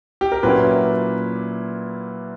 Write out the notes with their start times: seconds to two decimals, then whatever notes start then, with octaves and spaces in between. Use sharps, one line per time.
0.21 G4
0.32 A#4
0.43 A#2 F#3 A#3 C#4 E4 B4